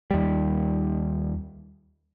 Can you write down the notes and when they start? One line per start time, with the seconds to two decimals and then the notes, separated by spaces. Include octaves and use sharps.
0.11 D#2 G3